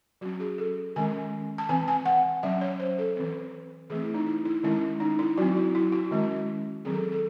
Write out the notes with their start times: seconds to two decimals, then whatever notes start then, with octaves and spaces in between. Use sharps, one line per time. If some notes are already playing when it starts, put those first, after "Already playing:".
0.21 F#3 C#4 F#4
0.40 G#4
0.58 A4
0.96 D#3 G#3 C#4 G#5
1.58 A5
1.69 E3 C4 G#5
1.88 G#5
2.05 F#5
2.43 F#3 C#4 E5
2.61 C#5
2.80 C5
2.98 A4
3.16 E3 C4
3.90 E3 A3 C4 G#4
4.02 E4
4.14 D#4
4.27 E4
4.45 E4
4.63 D#3 G#3 C#4 E4
5.00 D#4
5.19 E4
5.37 F#3 C4 F#4
5.57 E4
5.75 E4
5.92 F#4
6.11 D#3 G#3 C#4
6.85 D#3 F#3 C4 G#4
6.94 A4
7.03 G#4
7.12 A4